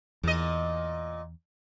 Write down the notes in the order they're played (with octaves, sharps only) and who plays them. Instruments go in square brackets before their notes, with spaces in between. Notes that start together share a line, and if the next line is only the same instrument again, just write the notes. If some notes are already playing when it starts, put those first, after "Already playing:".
[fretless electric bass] E2 [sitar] A#2 D#5